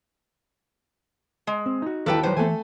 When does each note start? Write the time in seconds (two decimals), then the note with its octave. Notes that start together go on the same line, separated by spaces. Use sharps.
1.47 G#3
1.66 C4
1.82 D#4 F#4
2.06 D#2 E3 A4 B4 G5
2.23 F#3 B4 C5 F#5
2.37 E3 A3 A4 G#5